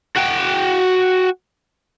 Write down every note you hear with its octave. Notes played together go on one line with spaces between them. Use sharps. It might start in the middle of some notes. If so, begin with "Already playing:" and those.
F#4 G5